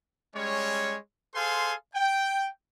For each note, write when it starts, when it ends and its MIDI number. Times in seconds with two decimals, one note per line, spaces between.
0.36 0.97 55
0.36 0.97 56
0.36 0.97 61
0.36 0.97 73
1.35 1.74 68
1.35 1.74 69
1.35 1.74 72
1.35 1.74 77
1.35 1.74 80
1.35 1.74 84
1.95 2.48 79